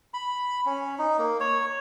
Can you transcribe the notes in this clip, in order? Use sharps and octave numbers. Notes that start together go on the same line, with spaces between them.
B5
C#4
D#4
A#3
C#5